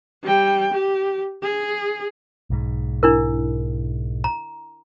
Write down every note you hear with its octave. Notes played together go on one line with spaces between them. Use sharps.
G3 G5
G4
G#4
B1 G#2
D4 E4 A#4
A#5